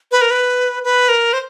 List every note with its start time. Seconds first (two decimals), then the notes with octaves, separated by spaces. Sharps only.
0.11 B4
0.21 A#4
0.31 B4
0.84 B4
1.09 A#4
1.33 C5